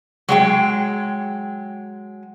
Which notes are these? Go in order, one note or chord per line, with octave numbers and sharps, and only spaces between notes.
F#3 G#3 G5